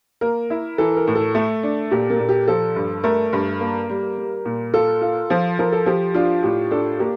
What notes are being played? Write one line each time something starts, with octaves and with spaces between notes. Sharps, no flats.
A#3 A#4
E4
E3 A4
A#4
A2
A4
A3 A4
D4
A#2 G4
A#3
A#2
G4
F3 A4
G2
A3 A#4
G2
A#3
G3
G3
A#2
F4 A4
F4
F3
F3 A#4
A4
F3 G4
D4 F4
A2 G4
D4 A4
A#3 G4